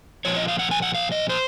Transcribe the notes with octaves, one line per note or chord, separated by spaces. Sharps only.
A#2 F3 C#5
D#5
F5
F#5
G#5
F#5
F5
D#5
C5